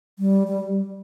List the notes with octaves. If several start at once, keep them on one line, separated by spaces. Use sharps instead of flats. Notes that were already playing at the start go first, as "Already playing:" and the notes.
G3
G3